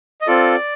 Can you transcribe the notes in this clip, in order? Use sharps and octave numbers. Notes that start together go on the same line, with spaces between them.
D#5
C4 F4 A4 D5